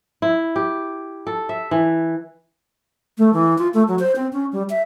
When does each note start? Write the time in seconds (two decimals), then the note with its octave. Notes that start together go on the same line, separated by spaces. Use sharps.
0.22 E4
0.56 G4
1.27 A4
1.49 E5
1.71 E3
3.18 A3
3.34 E3
3.58 F4
3.74 A3
3.88 F#3
3.99 C5
4.16 C4
4.33 C#4
4.52 G3
4.70 E5